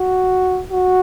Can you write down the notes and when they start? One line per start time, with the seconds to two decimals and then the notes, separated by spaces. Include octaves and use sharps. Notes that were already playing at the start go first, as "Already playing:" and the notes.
Already playing: F#4
0.71 F#4